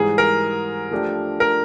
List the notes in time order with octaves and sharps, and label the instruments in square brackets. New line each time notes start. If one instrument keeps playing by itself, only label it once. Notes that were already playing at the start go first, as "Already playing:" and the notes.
Already playing: [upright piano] G#2 E3 G3 [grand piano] G#4
[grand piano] A#4
[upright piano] F3 A3 D4 G4
[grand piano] A#4